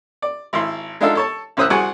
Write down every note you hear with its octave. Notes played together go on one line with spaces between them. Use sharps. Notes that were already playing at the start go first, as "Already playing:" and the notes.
D5
G#1 E4 C6
G#3 D4 D#4 F4 A4 E5
A4 C#5 A5
A1 C#3 C5 D#6 E6 F#6
C2 F#4 G#4 G#5 C#6